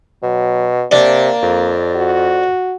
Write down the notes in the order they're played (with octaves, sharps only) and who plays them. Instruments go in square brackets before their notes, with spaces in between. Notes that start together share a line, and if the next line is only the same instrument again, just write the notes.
[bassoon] B2 [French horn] F#3
[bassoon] C3 [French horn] A#3 [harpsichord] D4
[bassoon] F2
[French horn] F#4